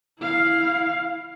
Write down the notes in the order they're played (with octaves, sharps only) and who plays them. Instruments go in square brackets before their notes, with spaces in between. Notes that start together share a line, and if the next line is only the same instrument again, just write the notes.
[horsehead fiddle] E4 F5